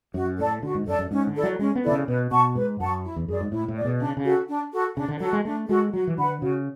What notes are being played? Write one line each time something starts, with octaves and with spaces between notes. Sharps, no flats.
F#2 F#4
A2 A4 D5 A5
D3 F#4
G#2
F#2 A4 D5 A5
F#2
G#2 C#4
D3
E4 A4 D5
F#3
G#3 C#4
B3
D3 E4 A4 D5
C#3
B2 B4
B2 F#5 A5 C#6
G#2 B4
F#2 F#5 A5 C#6
E4
E2
F#2 G#4 D5
G#2
A2 E4
A2
G#4 D5
B2
C#3 D4
C#3
F#4 A4
D4
F#4 A4
C#3 D4
D3
F#3 F#4 A4
G#3
A3 D4
G#3 F#4 A4
F#3 F#4
E3
D3 B4 F#5 B5
C#3 F#4